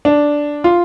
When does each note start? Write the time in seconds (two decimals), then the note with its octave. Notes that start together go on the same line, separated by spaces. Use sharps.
0.05 D4
0.64 F4